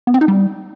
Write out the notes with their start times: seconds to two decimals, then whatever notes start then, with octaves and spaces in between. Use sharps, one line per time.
0.07 B3
0.14 C4
0.21 D#4
0.28 G3